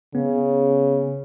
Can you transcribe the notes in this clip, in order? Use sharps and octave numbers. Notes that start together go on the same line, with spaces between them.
C#3 B3